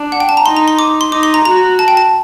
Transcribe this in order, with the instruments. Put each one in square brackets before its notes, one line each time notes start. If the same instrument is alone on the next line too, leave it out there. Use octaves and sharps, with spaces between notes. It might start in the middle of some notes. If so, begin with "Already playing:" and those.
Already playing: [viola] D4
[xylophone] F#5
G5
A5
A#5
[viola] D#4 [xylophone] C6
[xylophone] A#5
C6
D6
C6
[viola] D#4 [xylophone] D6
[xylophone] C6
A#5
[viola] F#4 [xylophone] A#5
[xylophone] A5
G5
A5